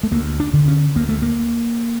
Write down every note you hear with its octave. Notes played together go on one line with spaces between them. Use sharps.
A3
D2 A#3
D4
D3
C#4
D2 A#3
A3
A#3